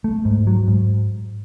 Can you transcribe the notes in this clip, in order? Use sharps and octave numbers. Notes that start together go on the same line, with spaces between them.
A3
G#2
F#3
G#2